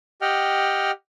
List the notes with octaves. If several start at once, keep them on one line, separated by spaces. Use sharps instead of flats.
G4 D#5 F#5 G5 F6